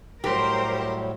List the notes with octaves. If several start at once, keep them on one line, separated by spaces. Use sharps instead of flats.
A2 F#3 G3 G4 A#4 C5